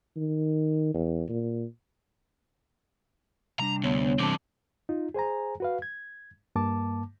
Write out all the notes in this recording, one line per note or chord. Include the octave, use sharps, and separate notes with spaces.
D#3
E2
A#2
C3 G3 D4 A#5
D2 B3 C#5
E3 C4 A5 D6
D#4 F4
G#4 C5 G#5 A#5
F#4 B4 F5
G#6
G2 A#3 A5 D6